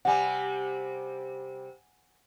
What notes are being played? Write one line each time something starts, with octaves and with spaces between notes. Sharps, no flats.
C3 G3 F#5 G#5